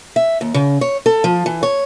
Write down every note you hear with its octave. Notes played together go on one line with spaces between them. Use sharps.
E5
D#2
C#3
C#5
A4
F3
E3
C#5